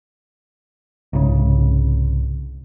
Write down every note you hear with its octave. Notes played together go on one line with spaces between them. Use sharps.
C2 G#2 C#3